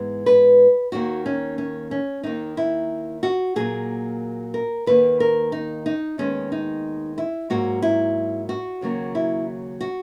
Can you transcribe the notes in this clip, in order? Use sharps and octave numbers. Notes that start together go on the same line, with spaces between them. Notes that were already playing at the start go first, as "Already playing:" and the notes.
Already playing: G#2 E3 G#3 B3
B4
D#2 D#3 A#3 F#4
C#4
C#4
C#4
D#2 D#3 A#3 D#4
E4
F#4
A#2 F#3 A#3 G#4
A#4
D#2 D#3 A#3 B4
A#4
D#4
D#4
D#2 D#3 G#3 B3 C#4
D#4
E4
G#2 F#3 A#3 F#4
E4
F#4
D#2 C#3 F#3 A#3
E4
F#4